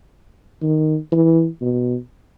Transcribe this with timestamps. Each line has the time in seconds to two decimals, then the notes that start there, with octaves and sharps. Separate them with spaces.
0.62 D#3
1.12 E3
1.61 B2